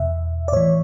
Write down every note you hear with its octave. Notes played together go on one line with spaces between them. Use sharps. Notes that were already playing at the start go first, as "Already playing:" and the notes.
Already playing: E2 B2 E5
D5
A2 E3 C#5